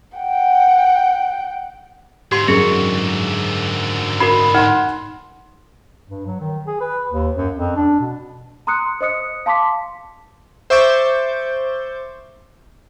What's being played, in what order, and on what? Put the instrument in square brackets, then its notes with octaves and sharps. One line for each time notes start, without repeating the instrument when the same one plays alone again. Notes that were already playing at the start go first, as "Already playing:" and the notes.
[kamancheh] F#5 G5
[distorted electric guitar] G#2 D3 [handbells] G4 C6
[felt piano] F#2 [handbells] G#4
[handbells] F#4 A#4 [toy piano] B5
[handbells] D#4 [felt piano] F#5 C6
[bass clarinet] G2
F#3
D#3
G#4
B4
D#2
F#2
F2
D4
B2
[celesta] A#5 C6 D#6 F#6 C#7
C5 D#5 D#6 C#7
F5 A5 C6 D6 B6
[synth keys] C5 E5 C#6 D6 G6 A6